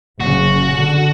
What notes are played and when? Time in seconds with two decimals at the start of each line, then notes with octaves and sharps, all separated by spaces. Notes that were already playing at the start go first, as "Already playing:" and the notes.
0.20 F#1 C#3 F#4
0.74 D3